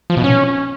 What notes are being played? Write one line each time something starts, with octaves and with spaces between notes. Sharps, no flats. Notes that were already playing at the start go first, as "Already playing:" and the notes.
F3
B2
C#4